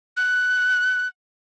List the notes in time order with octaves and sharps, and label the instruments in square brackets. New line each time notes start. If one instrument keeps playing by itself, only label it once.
[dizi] F#6